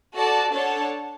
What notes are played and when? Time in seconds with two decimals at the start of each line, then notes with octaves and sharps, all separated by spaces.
0.15 F#4 A4 D5 A5
0.53 D4 A4 C#5 F#5 A5